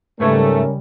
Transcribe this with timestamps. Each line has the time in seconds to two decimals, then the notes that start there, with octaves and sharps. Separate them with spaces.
0.20 G#2 C#3 G3 A3 C#4 A#4 B4 C#5